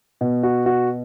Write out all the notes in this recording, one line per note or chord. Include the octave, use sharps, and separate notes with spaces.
B2
F#4
F#4